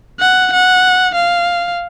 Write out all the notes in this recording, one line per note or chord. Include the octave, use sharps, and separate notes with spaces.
F#5
F#5
F5